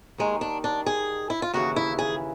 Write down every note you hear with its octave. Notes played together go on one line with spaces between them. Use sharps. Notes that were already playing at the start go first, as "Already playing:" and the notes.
D#2 D#3 G#3
D4
D4
G#4
E4
F4
D#2 C#3 E3 F#4
E4
G#4